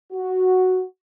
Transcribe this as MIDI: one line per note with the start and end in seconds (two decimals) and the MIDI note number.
0.13 0.84 66